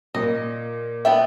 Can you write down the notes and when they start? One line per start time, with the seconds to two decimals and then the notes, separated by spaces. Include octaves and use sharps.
0.15 A#2 D#5
1.05 B3 D4 E5 G5